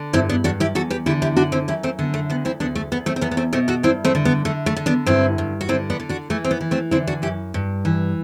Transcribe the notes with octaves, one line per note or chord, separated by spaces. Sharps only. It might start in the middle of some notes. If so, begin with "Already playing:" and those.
Already playing: D3
G2 C4 E4
B3 D4
G2 D4 F#4
E4 G4
E2 F#4 A4
G4 B4
D3 E4 G4
E4 G4
F#2 D4 F#4
C4 E4
F#2 E4 G4
A3 C4
D3 B3
A3
D2 B3
C4 E4
D2 B3 D4
A3
D2 B3
A3 C4
C4
E2 B3
B3
A3 C4
B2 A3 C4
F#4 A4
G2 C4 E4
A3 C4
D3
B3
D3 A3
A3
D3
B3 D4
G2 C4 E4
G2
F#4
D3 C4 E4
B3 D4
D3
D4 F#4
E3 A3
C4
B3
E3
A3 C4
D3 C4 E4
D4 F#4
F#2 E4 G4
G2
E3